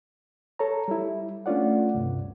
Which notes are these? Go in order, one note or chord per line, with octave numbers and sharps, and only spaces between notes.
A4 C#5 A#5
G3 E4
A3 C#4 D4 F4 D5 F#5
D2 G2 C3